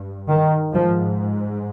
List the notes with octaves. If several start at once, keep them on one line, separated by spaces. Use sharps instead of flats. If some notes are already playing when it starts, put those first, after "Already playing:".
Already playing: G2
D#3
G#2 F3